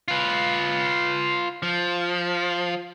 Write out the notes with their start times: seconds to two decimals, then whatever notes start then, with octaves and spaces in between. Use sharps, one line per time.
0.08 F4 B4
1.63 F3